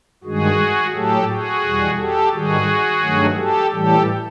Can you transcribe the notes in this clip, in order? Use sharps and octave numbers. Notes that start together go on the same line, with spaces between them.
G2 D#3 G#3 F#4 G#4
A2 F#3 A3 G4 A4
F#4 G#4
E2 B2 G3
G4 A4
G#2 D#3 G3 F#4 G#4
G2 D#3 F#3 A3
G4 A4
A2 E3 G3 G4 A4